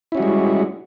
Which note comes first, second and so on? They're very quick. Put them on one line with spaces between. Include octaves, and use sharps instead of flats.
E4 C#4 F#4 G3 G#3